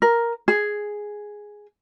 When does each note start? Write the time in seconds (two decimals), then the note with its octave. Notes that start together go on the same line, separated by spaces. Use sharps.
0.02 A#4
0.48 G#4